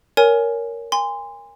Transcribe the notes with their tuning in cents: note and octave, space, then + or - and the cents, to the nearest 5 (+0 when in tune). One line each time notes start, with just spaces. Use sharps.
A#4 +0 C#5 +15 G#5 +0
G#5 -30 C6 -20